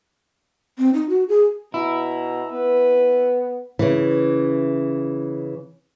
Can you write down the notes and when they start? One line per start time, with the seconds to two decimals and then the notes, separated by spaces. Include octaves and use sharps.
0.78 C4
0.94 D#4
1.09 F#4
1.29 G#4
1.74 B2 E4 A#5
2.52 B3 B4
3.79 C#3 E3